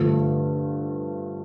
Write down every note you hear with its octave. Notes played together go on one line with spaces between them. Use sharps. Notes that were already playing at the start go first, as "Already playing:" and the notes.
Already playing: G2 D3 F3 A3